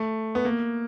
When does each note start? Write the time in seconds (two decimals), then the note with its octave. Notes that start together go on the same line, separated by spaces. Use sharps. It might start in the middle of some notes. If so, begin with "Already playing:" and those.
Already playing: A3
0.35 B3
0.45 A#3